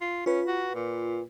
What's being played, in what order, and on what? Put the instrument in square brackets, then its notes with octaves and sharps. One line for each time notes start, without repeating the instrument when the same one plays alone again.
[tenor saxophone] F4
[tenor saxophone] C#4 [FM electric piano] F4 B4
[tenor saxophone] F#4
A#2